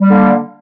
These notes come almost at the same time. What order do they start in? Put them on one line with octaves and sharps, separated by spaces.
G3 A#3 D3